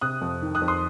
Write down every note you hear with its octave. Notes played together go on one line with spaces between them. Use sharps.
C3 D#6 F#6
F2
D#3
D#6 F#6
F2
C6 D#6